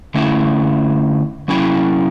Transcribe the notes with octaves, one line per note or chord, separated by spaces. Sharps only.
D3 A3 C#4 E4
F#3 C#4 E4